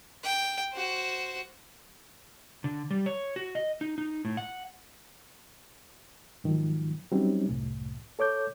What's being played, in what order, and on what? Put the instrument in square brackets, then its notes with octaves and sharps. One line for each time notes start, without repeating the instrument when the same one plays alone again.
[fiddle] G5
F#4 C5
[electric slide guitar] D3
G3
C#5
F#4
D#5
D#4
D#4
A2
F#5
[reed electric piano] G#2 D#3 F3 F#3
F#3 G3 C4 C#4 D#4
C2 F#2 A2
A4 C#5 D6 G6